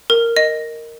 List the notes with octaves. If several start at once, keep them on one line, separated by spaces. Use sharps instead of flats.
A#4
D#5